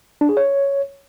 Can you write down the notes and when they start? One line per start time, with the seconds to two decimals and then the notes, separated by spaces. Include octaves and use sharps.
0.21 D4
0.29 G#4
0.37 C#5